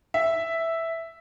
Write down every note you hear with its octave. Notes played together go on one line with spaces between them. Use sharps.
E5